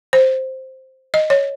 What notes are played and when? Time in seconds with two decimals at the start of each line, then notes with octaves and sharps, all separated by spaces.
0.13 C5
1.14 D#5
1.30 C#5